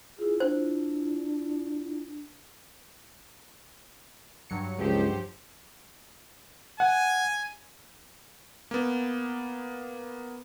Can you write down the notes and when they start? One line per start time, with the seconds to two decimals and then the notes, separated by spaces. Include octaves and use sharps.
0.19 E4 F4 G#4
0.40 D4 C5
4.50 G2 F#3 C#7
4.78 C#2 F3 G4 C5
6.80 F#5 G#5
8.71 A#3 B3